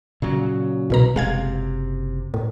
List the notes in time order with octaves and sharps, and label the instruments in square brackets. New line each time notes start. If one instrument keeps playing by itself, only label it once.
[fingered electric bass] A#2 C#3 F#3
[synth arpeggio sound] C2 B2 A#5
[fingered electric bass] F#1 C3 [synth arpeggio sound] G#3 F5 G#6
[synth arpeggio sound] A2